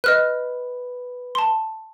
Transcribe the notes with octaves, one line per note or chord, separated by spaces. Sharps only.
B4 D#5 F6 F#6
A5 C6